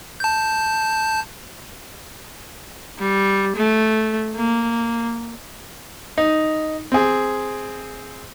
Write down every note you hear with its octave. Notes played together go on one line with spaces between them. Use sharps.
A5 G6
G3
A3
A#3
D#4
C4 G#4